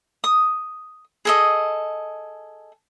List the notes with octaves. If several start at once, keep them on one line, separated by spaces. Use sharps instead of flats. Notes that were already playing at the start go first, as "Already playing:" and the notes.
D#6
G#4 A4 D#5